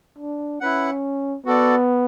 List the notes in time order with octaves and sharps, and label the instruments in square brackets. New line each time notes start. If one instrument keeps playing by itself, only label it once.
[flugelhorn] D4
[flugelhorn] C#4 [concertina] E4 B4 F#5
[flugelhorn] B3 [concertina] F#4 A4 D5